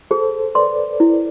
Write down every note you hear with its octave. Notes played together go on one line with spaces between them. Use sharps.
G#4 A4 C5
B4 D5 C6
E4